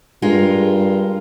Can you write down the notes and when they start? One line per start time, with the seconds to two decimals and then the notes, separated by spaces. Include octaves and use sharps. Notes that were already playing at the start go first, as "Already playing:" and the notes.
0.22 G2 G#3 F4 A#4